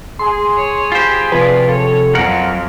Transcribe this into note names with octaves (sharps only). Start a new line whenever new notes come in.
G#4 C6
C#5
F4 G4 C5 B5
C3 F3 F4 B4 D5
A4 C#5
F2 F#3 A#4 F#5 F6